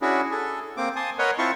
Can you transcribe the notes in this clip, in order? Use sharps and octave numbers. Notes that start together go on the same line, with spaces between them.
C#4 D4 E4 F#4 G#4
G#4 A4
A#3 C4 D6
G#5 A5 C6 D#6
A#4 B4 C#5 D#5 F#5
C4 E4 F4 A5 C6 C#6